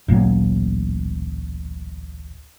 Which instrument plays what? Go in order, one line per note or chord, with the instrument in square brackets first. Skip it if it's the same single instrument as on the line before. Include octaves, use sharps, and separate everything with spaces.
[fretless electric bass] D1 A1 A#2 F#3